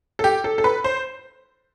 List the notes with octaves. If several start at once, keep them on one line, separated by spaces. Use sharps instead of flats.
A4
G4
A4
A4
B4
C5